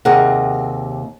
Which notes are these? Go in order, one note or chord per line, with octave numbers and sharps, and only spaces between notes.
D#2 C3 C4 G#4 A#4 F#5